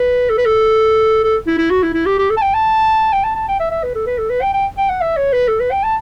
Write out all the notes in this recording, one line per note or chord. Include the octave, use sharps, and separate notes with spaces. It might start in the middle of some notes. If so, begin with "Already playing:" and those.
Already playing: B4
A4
B4
A4
A4
E4
E4
F#4
E4
E4
G4
G4
A4
A5
G5
A5
G5
A5
A5
G5
E5
E5
B4
A4
B4
A4
B4
G5
G5
G5
F#5
E5
C#5
B4
A4
B4
G5
A5